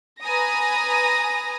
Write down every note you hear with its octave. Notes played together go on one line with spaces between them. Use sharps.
B4 G#5 A#5 D#6 A#6